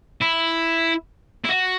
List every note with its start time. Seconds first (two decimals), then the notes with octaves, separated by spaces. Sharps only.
0.21 E4
1.45 E4
1.49 F#4